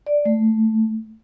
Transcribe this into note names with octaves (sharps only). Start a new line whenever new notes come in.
D5
A3